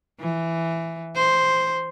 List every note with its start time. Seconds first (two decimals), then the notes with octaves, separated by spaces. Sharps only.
0.20 E3
1.15 C5